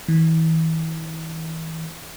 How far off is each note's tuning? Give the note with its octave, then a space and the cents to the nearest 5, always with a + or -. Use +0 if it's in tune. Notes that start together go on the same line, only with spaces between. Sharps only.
E3 -35